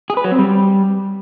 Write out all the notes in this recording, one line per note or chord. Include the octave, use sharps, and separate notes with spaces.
G#4
B4
F#3
C4
G3